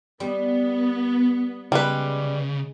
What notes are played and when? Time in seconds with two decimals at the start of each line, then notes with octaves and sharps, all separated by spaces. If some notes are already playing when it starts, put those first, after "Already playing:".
0.20 G3 B3
1.72 C#3 G3 G#3 B4